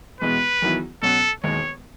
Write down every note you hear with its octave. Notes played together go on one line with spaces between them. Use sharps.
E2 B2 G#3 B3 B4
E2 D#3 F#3 B3 E4
B2 F#3 C#4 F#4 A4
E1 D#2 D#3 G#3 C#5